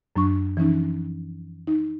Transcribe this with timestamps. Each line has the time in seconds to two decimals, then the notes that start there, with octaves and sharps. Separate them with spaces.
0.16 F#2 F#3 D4 C#6
0.57 E3 F3 C#4 D#4
1.67 D#4